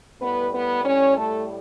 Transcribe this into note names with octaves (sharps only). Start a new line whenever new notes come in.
A2 G3 B3 B4
B3 B4
C#4 C#5
A3 A4